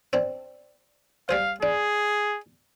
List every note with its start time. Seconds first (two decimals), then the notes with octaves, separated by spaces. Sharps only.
0.13 C4 D4
1.29 G3 G#4 C5 F5
1.63 D4 G#4